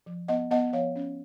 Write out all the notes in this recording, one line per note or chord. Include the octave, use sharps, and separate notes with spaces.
F3
B3 D#5 F#5
B3 D#5 F#5
F3 C#5 F5
C#4